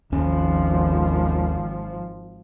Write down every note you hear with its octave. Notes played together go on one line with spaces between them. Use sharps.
G#1 D#2 F3 C#4